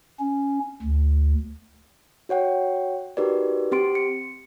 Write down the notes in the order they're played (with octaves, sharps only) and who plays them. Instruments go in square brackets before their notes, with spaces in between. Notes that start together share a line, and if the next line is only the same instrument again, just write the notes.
[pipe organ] C#4
D2
[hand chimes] F#4 C#5 F#5 G5
D#4 F#4 G4 A#4 B4 D5
C4 G4 C6 D7
C#7